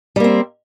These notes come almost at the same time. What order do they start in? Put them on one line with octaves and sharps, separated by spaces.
G3 A#3 C4